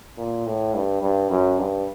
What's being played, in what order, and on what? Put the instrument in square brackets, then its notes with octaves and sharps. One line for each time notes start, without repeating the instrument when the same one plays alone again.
[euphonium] A#2
A2
G2
G2
F#2
G2